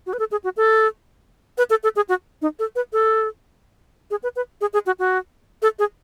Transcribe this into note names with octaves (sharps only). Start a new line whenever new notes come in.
F#4
B4
A4
G#4
F#4
A4
B4
A4
A4
G#4
F#4
D#4
A4
B4
A4
G#4
B4
B4
G#4
G#4
F#4
F#4
A4
G#4